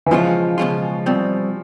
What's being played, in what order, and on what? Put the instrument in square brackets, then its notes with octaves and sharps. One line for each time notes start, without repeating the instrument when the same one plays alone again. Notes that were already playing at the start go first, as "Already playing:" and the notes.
[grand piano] E3
[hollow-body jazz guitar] C#2 B2 G#3 C#4 F4 [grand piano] F3
[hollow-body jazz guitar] C#2 B2 G#3 C#4 F4
C2 B2 G3 C4